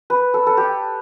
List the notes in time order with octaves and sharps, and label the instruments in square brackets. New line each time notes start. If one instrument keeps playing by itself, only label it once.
[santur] B4
A4
A4
G4